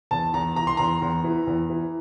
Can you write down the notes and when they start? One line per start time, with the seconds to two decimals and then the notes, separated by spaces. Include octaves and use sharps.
0.11 E2 A5
0.34 E2 A#5
0.56 E3 A#5
0.67 C6
0.77 E2 A#5
1.02 E2
1.24 E3
1.47 E2
1.70 E3